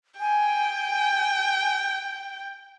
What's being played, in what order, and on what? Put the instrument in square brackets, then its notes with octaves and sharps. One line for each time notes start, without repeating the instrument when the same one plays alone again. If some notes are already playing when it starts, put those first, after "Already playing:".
[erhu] G5 [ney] G#5